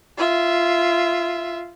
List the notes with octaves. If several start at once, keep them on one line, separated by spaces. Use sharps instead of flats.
F4 E5